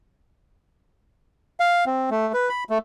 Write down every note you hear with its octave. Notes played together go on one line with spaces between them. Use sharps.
F5
C4
A3
B4
B5
A3